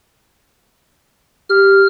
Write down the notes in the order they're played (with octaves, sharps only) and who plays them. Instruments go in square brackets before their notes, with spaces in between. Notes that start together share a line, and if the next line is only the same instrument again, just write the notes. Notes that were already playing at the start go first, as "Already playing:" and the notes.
[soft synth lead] G4 [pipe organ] F6